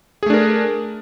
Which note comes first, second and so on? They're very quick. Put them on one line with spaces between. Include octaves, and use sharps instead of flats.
G#4 A3 D4 A#4